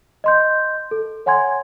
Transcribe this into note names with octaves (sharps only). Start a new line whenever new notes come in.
D#5 C6 G6
A4
C#5 F#5 G#5 C6 G#6